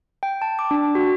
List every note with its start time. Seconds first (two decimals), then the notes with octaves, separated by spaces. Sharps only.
0.23 G5
0.42 A5
0.59 D6
0.71 D4
0.95 F#4